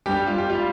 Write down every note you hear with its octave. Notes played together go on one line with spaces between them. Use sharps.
G2 G3 G4
F4
G4
G3 F4